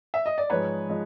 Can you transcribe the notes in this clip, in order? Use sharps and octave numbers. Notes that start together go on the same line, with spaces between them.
E5
D#5
D5
G#2 F3 G#3 B4 C#5
F3 G#3